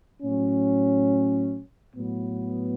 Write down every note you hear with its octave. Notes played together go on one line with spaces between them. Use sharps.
A2 F#3 C#4
A2 F#3 B3